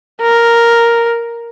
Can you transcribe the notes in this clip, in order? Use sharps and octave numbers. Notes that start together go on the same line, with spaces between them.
A#4